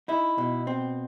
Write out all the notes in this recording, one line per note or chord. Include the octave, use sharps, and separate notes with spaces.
D#4 E4
B2
C4